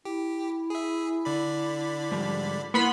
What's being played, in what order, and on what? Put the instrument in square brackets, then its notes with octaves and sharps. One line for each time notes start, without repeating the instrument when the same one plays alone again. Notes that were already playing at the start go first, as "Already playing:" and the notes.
[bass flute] E4 [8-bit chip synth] G4
[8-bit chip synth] G#4 E5
D3 D5 B5
[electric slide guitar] G#2 F3 G3
[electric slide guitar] A#3 [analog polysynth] B3 B5 C6 [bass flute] E4